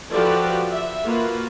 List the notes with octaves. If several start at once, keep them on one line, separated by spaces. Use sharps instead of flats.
F3 F#4 G4 A4 B4 D5
E5
A#3 F4 F#4 B4